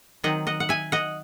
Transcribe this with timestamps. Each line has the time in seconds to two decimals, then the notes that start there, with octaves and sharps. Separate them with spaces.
0.24 D#3 F#3 C4 D#5 F#5
0.47 D#5 F#5
0.60 F#5
0.69 E5 G#5
0.92 D#5 F#5